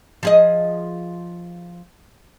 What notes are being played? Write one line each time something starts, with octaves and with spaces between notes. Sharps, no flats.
F3 G#4 D#5